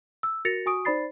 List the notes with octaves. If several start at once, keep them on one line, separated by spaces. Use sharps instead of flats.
E6
F#4 A#4 A6 A#6 C#7 F7
F#4 G#5 C#6 D#6 D7
D#4 C5 D5 B5 A6 C7